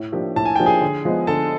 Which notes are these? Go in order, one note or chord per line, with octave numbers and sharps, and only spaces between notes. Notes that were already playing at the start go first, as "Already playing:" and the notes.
Already playing: A2
F3 A#3 D4 G4
A2 A5
G#5
F3 A#3 D4 G4 G5
G#4 G#5
D3
F3 G#3 B3
D3 A4 A5